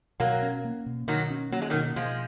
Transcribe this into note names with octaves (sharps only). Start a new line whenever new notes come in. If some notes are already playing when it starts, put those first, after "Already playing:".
B2 F#3 A#3
C#4
A#3
B2
B2 D#3 F#3
C#4
F#3 A#3
G#3
D#3 F#3
B2
B2 F3 G#3